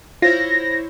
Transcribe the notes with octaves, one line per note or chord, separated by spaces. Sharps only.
E4 F4 C5 C#5 A#6